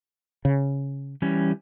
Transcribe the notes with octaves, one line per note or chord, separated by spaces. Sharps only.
C#3
E3 G3 C#4